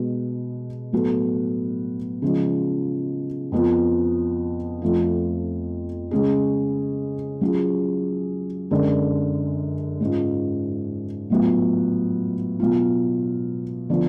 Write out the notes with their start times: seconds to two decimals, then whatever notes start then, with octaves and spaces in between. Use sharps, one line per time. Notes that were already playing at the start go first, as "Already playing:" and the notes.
Already playing: B2 G#3 B3 F#4
0.92 A2 F#3 B3 F#4 A4
2.22 C#3 F3 G#3
3.52 F2 F3 B3 F4
4.82 F2 F3 A3 F4
6.11 C#3 G#3 C#4 G#4
7.41 F#3 C#4 F4 G#4
8.71 F#2 D3 G#3
10.00 G#2 G#3 C#4 F4
11.30 A2 F#3 B3 F4
12.60 B2 F#3 B3 F4
13.90 D3 F3 B3